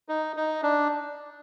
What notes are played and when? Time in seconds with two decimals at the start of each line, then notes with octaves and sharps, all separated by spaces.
0.09 D#4
0.36 D#4
0.63 D4